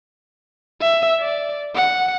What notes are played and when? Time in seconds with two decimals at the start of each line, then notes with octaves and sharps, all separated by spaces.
0.81 E5
1.20 D5
1.76 F#5